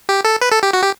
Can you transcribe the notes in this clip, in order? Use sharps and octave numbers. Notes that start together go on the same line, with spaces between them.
G4
A4
B4
A4
G4
F#4
G4